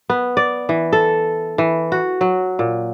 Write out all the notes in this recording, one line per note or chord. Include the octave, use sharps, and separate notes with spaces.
B3
D5
E3
A4
E3
F#4
F#3
A#2